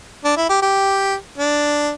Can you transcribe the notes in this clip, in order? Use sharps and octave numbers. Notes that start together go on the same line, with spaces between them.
D4
E4
G4
G4
D4